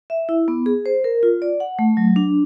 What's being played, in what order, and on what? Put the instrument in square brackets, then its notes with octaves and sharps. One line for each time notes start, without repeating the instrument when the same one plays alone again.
[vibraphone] E5
E4
B3
G#4
C5
A#4
F4
D5
F#5
A3
F#3
D4